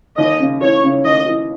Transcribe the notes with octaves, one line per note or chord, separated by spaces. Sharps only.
D#2 D#5
C#3
E3 C#5
C#3
D#2 D#5
E3